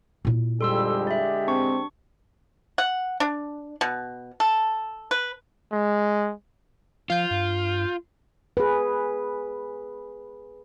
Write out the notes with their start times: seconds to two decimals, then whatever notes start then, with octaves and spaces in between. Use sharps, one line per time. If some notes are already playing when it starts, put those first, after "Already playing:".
0.25 A#2 E4
0.61 F2 D3 G3 G#3 G4 A4 C6 E6
1.07 D5 E5
1.47 C4 D4 C#6
2.78 F#5
3.20 D4
3.81 B2
4.40 A4
5.11 B4
5.72 G#3
7.10 F3 F4 F5 G6
7.31 G2
8.57 G#4 B4